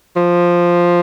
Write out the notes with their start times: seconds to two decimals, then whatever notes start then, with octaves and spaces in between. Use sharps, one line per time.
0.16 F3